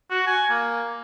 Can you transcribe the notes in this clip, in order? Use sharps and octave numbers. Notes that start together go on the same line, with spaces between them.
F#4
G#5
A#3